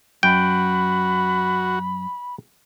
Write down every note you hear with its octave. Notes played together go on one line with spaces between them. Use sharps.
F#2 F#4 G5 B5